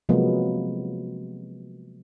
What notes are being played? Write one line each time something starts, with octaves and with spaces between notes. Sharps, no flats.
C3 F3 F#3 G#3 A#3 B3